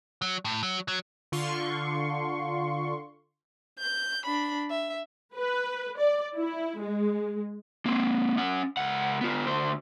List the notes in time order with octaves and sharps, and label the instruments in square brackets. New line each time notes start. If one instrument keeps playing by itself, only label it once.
[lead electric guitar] F#3
A2
F#3
F#3
[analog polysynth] D3 F4 C6 C#6
[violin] G6
D4 B5
E5
[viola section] B4
D5
E4
G#3
[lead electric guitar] A#3 C4
C#4 F#5
C#2 F#5
B3 F4
D2 C5